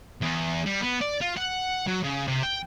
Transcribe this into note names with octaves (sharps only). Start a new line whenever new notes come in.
E2
G3
B3
D5
F4
F#5
F#3
C#3
C3
G5